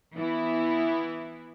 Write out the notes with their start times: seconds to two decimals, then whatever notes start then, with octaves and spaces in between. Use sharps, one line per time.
0.16 E3 B3 E4